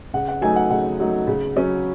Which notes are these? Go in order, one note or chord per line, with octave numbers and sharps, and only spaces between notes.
C#3 F#5
F#5
F#3 A3 D#4 G#5
F#5
C#3 F#5
F#3 A3 D#4
C#3
F#3 C#4